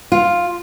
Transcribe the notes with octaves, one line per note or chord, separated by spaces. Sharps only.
F4